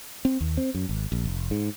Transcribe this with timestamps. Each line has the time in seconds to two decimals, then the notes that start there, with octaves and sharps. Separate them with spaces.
0.25 C4
0.41 D#2
0.57 C4
0.75 F#2
0.89 G#1
1.12 A#1
1.25 F1
1.51 G#2